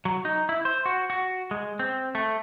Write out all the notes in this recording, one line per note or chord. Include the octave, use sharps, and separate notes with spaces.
F#3
D#4
E4
C5
F#4
F#4
G#3
C4
A3